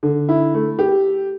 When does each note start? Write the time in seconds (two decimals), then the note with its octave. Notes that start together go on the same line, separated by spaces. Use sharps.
0.03 D3
0.29 E4
0.54 A3
0.79 G4